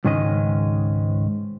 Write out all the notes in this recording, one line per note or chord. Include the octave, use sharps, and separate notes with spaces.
C#2 G#2 D#3 G#3 C#4 D#5